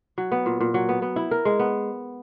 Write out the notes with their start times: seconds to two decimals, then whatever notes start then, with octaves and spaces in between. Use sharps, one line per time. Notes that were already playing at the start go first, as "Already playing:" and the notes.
0.18 F#3
0.32 B3
0.46 A#2
0.60 A#2
0.74 F#3
0.89 B3
1.02 B3
1.16 E4
1.31 A#4
1.45 G#3
1.59 B3